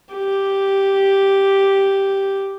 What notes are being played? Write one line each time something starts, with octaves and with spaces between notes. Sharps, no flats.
G4